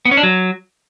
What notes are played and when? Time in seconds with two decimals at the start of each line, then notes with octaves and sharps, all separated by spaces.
0.05 B3
0.11 C#4
0.17 D4
0.23 F#3